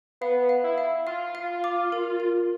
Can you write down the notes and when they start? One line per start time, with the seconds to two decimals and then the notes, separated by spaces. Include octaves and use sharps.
0.21 B3 F5
0.49 F5
0.64 E4
0.78 F5
1.07 F4 F5
1.35 F5
1.64 D6
1.92 A#4
2.20 A#4